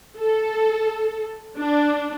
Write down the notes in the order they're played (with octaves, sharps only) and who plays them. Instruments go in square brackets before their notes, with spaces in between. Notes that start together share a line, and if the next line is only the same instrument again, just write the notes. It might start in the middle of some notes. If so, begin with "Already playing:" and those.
[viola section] A4
D4